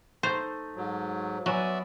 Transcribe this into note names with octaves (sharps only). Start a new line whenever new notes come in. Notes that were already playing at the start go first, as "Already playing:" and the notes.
A3 D#4 C5 G6
G#2 F#3
F#3 B3 F#4 D5 E5 G#5